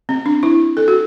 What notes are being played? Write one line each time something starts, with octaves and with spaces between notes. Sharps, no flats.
C4
D4
E4
A4
F#4